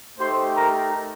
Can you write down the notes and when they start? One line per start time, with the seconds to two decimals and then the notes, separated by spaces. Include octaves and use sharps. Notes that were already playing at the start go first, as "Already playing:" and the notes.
0.19 A3 D#4 G4 C5 C6
0.56 A#4 A#5